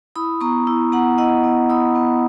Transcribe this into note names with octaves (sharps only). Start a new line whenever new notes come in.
E4 B5 D#6
B3 A#5 C#6
E4
B3 F#5 A#5
E4 D#5 F#5
B3
E4 B5 D#6
B3